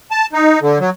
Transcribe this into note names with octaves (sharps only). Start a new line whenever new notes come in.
A5
D#4
D3
F#3